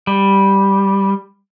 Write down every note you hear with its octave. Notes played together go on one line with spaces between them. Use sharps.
G3